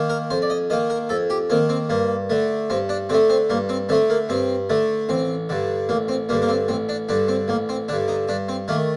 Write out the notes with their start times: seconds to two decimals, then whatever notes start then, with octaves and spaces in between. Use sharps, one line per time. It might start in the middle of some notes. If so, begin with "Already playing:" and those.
Already playing: D#3 A#3
0.10 A#4
0.30 F2 C5
0.42 D5
0.50 D#5
0.70 D#3 A#3 D#5
0.90 A#4
1.09 F2 A4
1.30 G4
1.50 D#3 A#3 C4
1.69 C4
1.89 G2 A#3
2.30 D3 A3
2.70 G2 C4
2.89 D4
3.09 D3 A3 C4
3.30 C4
3.50 G2 A#3
3.69 C4
3.89 D3 A3 C4
4.10 A#3
4.29 G2 C4
4.70 D3 A3
5.09 A1 C4
5.49 G2 D3
5.89 A1 A#3
6.08 C4
6.29 G2 D3 A#3
6.42 A#3
6.49 C4
6.68 A1 C4
6.89 D4
7.09 G2 D3 D4
7.28 C4
7.48 A1 A#3
7.69 C4
7.88 G2 D3 D4
8.08 D#4
8.28 G2 D4
8.49 C4
8.68 D#3 A3 A#3